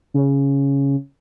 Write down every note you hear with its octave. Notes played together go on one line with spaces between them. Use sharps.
C#3